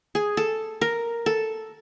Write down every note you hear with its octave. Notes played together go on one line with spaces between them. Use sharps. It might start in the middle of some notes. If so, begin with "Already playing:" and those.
G#4
A4
A#4
A4